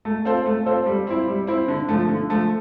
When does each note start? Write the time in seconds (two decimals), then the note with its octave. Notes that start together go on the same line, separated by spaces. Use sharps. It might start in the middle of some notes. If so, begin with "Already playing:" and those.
0.05 A3
0.25 C4 F4 A4 C5
0.46 A3
0.66 C4 F4 A4 C5
0.86 G3
1.07 C4 E4
1.28 G3
1.47 C4 E4
1.68 D3
1.89 F3 A3
2.09 D3
2.29 F3 A3